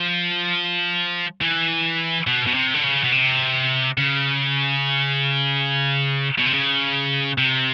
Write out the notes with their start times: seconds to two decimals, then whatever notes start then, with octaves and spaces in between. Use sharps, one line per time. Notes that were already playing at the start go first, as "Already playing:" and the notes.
Already playing: F3
1.41 E3
2.27 B2
2.47 B2
2.55 C3
2.74 D3
2.84 C#3
3.04 B2
3.13 C3
3.98 C#3
6.38 B2
6.46 C3
6.53 C#3
7.38 C3